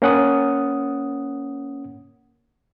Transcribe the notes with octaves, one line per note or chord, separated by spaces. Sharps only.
A#3 C#4 F#5 D#6